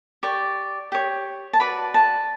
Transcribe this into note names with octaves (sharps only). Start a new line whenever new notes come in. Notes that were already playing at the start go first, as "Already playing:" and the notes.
G4 D5 C#6
G4 C#5
A5
F#4 B4 D5 B5
A5